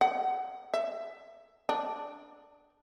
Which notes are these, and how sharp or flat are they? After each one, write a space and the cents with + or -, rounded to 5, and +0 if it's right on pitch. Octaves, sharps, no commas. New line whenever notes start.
F#5 +15
E5 +20
D4 -5